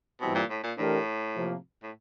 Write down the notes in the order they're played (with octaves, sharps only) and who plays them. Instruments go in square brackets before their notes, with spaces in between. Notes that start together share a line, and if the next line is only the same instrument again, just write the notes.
[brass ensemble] G2 E3 G3 C4 E4 [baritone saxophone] B2
[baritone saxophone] A#2
A2
A#2
[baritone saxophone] A2 [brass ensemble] E3 A3 D4 G4 A#4
[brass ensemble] C3 F3 A#3
[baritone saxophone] A2